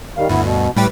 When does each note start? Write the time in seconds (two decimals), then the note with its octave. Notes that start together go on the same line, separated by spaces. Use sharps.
0.17 D#3 G3 F5
0.29 D2 G2 B3 E4
0.43 B2
0.76 A2 G3 G4 B4